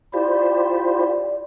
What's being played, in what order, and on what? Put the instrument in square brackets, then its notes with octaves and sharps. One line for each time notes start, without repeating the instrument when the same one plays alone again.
[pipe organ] E4 [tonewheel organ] F4 G4 C5 [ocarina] D5